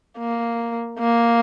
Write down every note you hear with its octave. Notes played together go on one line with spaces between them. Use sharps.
A#3
A#3